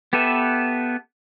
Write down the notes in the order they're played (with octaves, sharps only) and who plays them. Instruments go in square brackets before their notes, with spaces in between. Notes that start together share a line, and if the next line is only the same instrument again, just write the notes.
[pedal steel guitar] B3 G4 A4 B4 E5